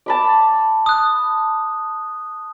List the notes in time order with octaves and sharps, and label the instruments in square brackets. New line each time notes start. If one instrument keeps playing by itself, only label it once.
[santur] A5 B5 D6
[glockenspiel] D#6 F#6